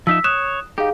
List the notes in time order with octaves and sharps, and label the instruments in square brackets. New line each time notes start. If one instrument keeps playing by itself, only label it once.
[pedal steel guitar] F3 D#4 E5 [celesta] E6 B6
[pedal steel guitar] C#5 [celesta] D#6 F#6 E7
[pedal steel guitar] D#4 G4 [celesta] G#4 F5